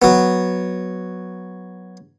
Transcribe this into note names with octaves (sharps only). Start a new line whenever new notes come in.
F#3 B3